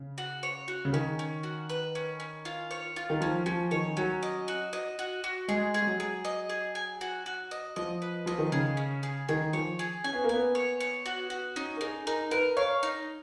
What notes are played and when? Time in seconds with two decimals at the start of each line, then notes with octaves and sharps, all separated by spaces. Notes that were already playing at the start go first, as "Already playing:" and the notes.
Already playing: C#3
0.18 F#4
0.43 C#5
0.68 F#4
0.85 C#3
0.93 D#3 C#4
1.19 C#4
1.43 F#4
1.69 B4
1.95 C#4
2.20 C#4
2.45 F4
2.71 C#5
2.96 F4
3.10 D#3
3.21 F3 C#4
3.46 F3 C#4
3.71 D#3 C#5
3.97 F#3 C#4
4.23 D#5
4.48 F#4
4.73 D#5
4.99 F#4
5.24 F#4
5.48 G#3 G#4
5.74 G#4
5.82 G#3
5.87 F#3
6.00 G#4
6.25 D#5
6.50 G#4
6.75 G#5
7.01 F#4
7.26 F#4
7.51 D#5
7.76 F3 D#5
8.02 B4
8.26 F3 D#5
8.39 D#3
8.52 C#3 G#4
8.77 C#4
9.03 G#4
9.29 D#3 G#4
9.53 F3 C#5
9.79 G#4
10.04 C#4 G#5
10.14 B3
10.24 A#3
10.29 B3 G#5
10.55 C#5
10.80 C#5
11.06 F#4
11.30 F#4
11.56 C#4 D#4
11.77 A#4
11.81 D#4 G#4
12.07 D#4 A#4
12.31 A#4 B4
12.57 C#5 F5
12.83 D#4